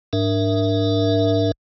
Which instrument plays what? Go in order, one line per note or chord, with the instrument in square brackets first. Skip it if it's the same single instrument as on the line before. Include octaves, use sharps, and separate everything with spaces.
[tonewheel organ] G#2 D4 A#4 E5